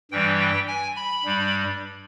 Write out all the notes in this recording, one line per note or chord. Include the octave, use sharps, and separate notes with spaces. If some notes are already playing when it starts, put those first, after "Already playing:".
G2 E3 G3 G5
G5
G#5
B5
G2 G3